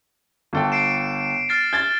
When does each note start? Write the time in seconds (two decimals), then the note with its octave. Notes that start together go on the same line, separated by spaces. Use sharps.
0.53 G1 A4 G5
0.72 C7 D7 E7
1.49 F6 A6 C7
1.73 G#6 A6 G7